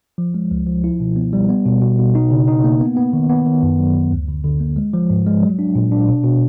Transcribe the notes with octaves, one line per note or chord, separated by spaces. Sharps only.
F3
G#3
C#2
F3
E4
B2
B3
G3
B3
B2
B2
B2
D#4
C#3
D#4
A#3
B3
B3
D#3
B3
D#3
F#2
F#3
F#2
D2
D3
D3
A#3
G#3
F3
G#2
G#3
F#3
D4
A#2
D4
B2
B2